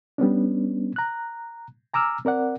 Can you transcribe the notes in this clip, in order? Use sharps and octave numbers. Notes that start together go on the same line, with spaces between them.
G3 B3 C#4 D4
A#5 F#6
G#5 A#5 D6 E6 F6
C4 A#4 D5 F#5